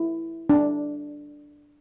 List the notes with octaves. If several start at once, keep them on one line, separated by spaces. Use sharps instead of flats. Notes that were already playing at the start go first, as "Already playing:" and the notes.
Already playing: E4
D4